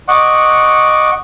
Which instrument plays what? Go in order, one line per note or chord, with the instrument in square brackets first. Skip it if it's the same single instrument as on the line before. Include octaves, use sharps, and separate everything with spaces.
[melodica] D#5 F#5 C#6 D6